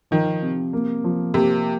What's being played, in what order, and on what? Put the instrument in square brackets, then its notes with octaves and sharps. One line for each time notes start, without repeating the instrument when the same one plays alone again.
[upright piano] D#3 [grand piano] F3
[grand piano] C3
A#3
F3
[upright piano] C3 [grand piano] A#3